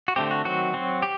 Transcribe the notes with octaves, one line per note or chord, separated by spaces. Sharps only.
F#4
D3 A3 C4 G4
F#4
D#3 F#3 C4 F#4
F#3 C4
G4